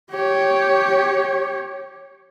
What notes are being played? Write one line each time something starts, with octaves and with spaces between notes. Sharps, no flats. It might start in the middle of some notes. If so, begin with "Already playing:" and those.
G4 C#5